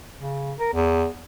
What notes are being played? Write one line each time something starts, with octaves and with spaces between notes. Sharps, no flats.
C#3
A#4
E2